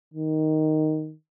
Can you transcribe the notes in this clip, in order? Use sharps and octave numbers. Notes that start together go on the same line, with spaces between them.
D#3